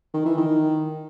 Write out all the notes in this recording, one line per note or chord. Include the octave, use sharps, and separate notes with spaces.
D#3
E3
D#3